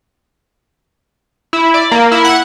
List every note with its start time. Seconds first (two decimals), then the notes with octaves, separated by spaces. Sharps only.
1.53 E4
1.74 D5
1.91 A#3
2.12 E4
2.25 F#5